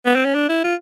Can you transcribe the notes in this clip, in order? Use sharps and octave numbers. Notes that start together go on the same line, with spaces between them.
B3
C4
C#4
D4
E4
F4